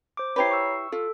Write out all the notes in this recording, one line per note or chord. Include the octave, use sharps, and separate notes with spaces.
C5 D6
E4 G4 B4 C#5 A#5 C7
C#6 E6
F4 A4